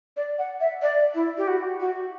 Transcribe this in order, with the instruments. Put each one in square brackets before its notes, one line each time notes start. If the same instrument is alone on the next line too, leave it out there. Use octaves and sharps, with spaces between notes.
[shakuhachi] D5
F#5
E5
D5
E4
G4
F#4
F#4